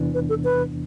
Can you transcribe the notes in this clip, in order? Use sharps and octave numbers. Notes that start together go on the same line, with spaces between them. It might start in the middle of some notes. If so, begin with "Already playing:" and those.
Already playing: E2 C3 E3 B3 D4
B4
A4
B4